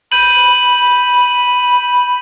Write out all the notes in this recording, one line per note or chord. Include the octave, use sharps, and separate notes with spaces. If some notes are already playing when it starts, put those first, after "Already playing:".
B5 G6 D#7 F#7